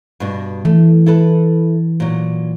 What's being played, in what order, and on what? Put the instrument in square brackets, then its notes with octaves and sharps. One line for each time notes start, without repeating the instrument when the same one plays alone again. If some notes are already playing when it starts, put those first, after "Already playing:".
[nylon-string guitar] G2 B2
[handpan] E3 [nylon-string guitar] A3
[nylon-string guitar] E4 A4 B4
A#2 F#3